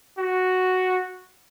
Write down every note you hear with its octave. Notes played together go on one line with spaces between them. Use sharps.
F#4